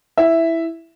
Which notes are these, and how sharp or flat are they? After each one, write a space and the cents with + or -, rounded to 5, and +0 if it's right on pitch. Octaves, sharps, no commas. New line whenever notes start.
E4 +0 E5 +0